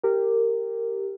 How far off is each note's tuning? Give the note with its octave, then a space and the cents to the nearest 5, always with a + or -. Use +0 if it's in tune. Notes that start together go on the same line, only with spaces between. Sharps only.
G4 +0 A#4 -20